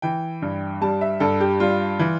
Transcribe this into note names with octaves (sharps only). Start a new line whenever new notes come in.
E3 G5
G2
G3 A5
E5
G2 A4
G4
G3 F4
E3